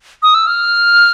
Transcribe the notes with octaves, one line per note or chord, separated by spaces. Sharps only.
D#6
E6
F6